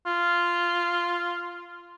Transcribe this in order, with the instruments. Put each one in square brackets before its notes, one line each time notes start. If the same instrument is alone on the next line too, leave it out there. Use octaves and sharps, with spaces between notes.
[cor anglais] F4